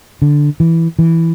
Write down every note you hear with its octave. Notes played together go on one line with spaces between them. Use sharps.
D3
E3
E3